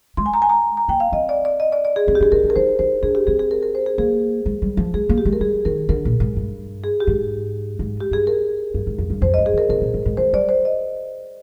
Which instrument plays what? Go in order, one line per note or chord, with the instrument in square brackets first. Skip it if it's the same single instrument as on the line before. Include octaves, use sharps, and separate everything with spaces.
[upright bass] G#3 [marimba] C6
[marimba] G#5
A#5
G#5
A#5
A#5
[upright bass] A#3 [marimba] G5
[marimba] F5
[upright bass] C4 [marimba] D#5
[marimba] D5
D5
D#5
D5
D5
G#4
[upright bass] C4 [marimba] G#4
[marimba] G4
[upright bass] D4 [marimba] G#4
[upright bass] D4 [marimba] A#4
[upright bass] D4
[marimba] A#4
[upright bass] D#4 [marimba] C5
[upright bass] D#4 [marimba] C5
[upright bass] D4 [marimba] G#4
[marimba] G4
[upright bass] C4 [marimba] G#4
[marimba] G#4
A#4
A#4
C5
G#4
[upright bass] A#3 [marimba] G#4
[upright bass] G#3
G3
F3
[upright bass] G#3 [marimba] G#4
[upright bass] A#3
[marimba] G4
[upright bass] G#3
[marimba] A#4
[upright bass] G3 [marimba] G#4
[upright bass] D#3 [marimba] A#4
[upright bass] D3 [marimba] A#4
[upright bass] A#2
G#2
G2
[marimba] G#4
G4
[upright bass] G#2
G#2
[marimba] G4
[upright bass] G2 [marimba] G#4
[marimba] A#4
[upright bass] G2
G#2
F2
G2
[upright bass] F2 [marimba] C5
[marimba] D#5
[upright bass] G2
[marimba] G#4
[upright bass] D3 [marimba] A#4
[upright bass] C3 [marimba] A#4
[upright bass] A#2
G#2
G#2
[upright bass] D#3 [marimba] C5
[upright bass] G3 [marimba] D5
[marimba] C5
D#5